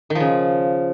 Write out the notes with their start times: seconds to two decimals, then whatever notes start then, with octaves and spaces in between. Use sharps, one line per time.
0.10 D#3
0.15 F3
0.20 C#3